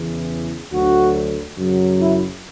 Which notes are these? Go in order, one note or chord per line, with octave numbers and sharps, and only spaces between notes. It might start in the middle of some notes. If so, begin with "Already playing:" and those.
Already playing: E2 C#3 E3
D2 D3 F#3 F#4
F#2 C#3 F#3
E4